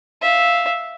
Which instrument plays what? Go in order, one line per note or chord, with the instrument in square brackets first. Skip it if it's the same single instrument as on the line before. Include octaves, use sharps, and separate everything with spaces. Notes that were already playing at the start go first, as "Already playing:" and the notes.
[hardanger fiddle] E5 F5